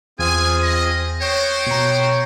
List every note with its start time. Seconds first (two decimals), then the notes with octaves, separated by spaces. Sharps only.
0.19 E2 C4 F4 G#4 G#5
0.63 D#5
1.21 B3 F#4 C5 C#5 G5
1.66 B2 A#5